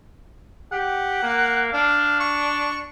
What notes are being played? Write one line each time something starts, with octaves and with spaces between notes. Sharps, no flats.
G4 F#5
A#3
D4 F5
C#6